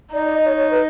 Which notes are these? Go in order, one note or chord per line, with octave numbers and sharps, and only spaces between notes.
D#4 D5
D5
D#5
C#5
C#5
B4